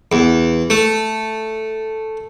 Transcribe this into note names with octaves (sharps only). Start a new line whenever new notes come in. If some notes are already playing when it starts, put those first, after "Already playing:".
E2
A3